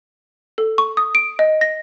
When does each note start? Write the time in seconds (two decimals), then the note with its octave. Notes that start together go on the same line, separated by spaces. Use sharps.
0.58 A4
0.78 C#6
0.97 D#6
1.15 D7
1.39 D#5
1.61 A#6